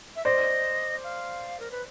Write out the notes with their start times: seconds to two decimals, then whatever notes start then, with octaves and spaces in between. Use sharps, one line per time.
0.15 E5
0.25 C5 D5 D#5
1.03 F5
1.59 A#4
1.71 B4